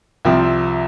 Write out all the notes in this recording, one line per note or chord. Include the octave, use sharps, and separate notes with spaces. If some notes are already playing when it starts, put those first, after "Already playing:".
C2 C3 F3 C4